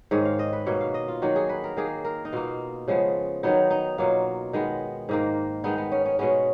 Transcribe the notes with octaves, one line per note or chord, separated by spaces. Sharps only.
G#2 D#3 G#3 C#5
F5
D#5
B4
B2 A#3 C#5
F5
D#5
F4
D#3 F#3 A#3 F#4
G#4
B4
A#4
D#3 A#3 G#4
A#4
D#4
B2 A#3 F4
C#3 F3 G#3 B3
D#3 F#3 B3 D#4
D#4
B2 F#3 A#3 F4
D#3 G#3 B3
G#2 D#3 A#3
D#3 G#3 B3 D#4
B3
C#4
C#4
B2 G#3 B3 C#4